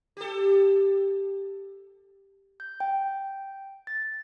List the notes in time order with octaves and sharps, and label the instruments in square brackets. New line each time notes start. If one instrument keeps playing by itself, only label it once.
[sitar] G4 A4
[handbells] G6
G5
A6